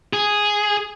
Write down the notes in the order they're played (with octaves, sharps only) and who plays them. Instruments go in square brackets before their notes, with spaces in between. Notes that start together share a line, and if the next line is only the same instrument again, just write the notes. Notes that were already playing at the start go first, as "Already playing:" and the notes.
[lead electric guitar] G#4